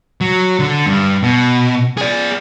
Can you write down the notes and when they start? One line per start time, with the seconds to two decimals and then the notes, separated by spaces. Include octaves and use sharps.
0.21 F#3
0.59 D3
0.86 G2
1.23 B2
1.97 G#4 D5